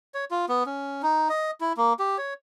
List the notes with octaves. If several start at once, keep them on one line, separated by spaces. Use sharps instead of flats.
C#5
F4
B3
C#4
D#4
D#5
E4
A#3
G4
C#5